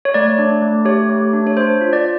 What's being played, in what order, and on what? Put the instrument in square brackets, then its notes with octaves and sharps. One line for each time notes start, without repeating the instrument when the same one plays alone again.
[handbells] C#5
A3 D5
D4
A3
G4 C#5
A3
D4
C#5
D4 C5
F4
D5